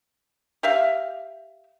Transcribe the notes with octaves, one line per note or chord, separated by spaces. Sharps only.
G4 E5 F5